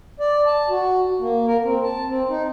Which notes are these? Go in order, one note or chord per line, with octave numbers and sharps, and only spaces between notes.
D5
A5
F#4
A#3
A#4
C4
A5
C4
D#4